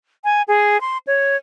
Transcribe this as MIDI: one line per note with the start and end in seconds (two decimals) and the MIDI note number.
0.24 0.42 80
0.48 0.80 68
0.81 0.98 84
1.07 1.36 73